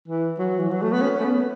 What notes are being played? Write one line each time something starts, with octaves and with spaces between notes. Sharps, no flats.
E3
F#3
E3
F#3
A3
B3
C#4
A3
B3